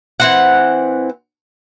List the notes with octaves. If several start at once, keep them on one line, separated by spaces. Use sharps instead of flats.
E3 C4 F#5